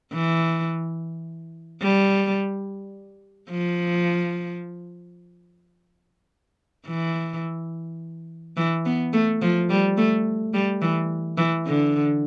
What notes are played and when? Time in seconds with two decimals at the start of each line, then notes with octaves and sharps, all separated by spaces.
0.13 E3
1.82 G3
3.50 F3
6.88 E3
8.57 E3
8.85 B3
9.13 A3
9.42 F3
9.70 G3
9.97 A3
10.54 G3
10.82 E3
11.38 E3
11.67 D3